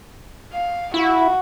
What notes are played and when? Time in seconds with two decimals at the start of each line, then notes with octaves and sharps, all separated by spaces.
0.53 F5
0.94 E4 F#4